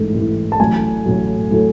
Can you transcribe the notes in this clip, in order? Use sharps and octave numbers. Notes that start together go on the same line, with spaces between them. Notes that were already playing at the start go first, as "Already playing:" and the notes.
Already playing: A1 G#2 E3 A3
A1 G#2 E3 A3
A5
A1 A2 F#3 A3 G#5
A1 A2 F#3 A3
A2 F#3 A3